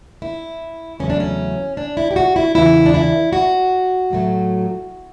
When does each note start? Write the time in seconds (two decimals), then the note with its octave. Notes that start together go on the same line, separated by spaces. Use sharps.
0.22 E4
1.00 E2 C#3 F#3 A3 C#4
1.10 D4
1.20 C#4
1.77 D4
1.97 E4
2.11 G4
2.16 F#4
2.36 E4
2.55 E2 C#3 E3 E4
2.86 D4
2.94 E4
3.33 F#4
4.11 A2 F#3 A3